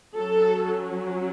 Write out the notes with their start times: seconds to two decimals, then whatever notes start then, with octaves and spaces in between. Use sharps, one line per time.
0.17 F#3 C#4 A4